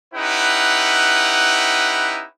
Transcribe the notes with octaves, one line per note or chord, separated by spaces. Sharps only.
C#4 D#4 E4 G4 B4 F#5